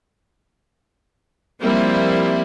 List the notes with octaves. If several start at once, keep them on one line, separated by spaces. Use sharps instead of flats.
F3 G3 A#3 C4 E4